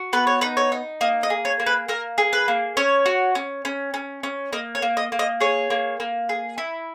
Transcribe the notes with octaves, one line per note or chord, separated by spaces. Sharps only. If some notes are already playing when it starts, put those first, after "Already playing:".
Already playing: F#4
B3 B4
C#5
D#4 B4
C#5
D#4
A#3 D#5
D#5
G#4
C#5
A#3
B4
A#3 A#4
G#4
B4
A#3
C#4 C#5
F#4
C#4
C#4
C#4
C#4
A#3 D#5
C#5
A#3
D#5
A#3
D#5
G#4 C#5
A#3
A#3
G#4
E4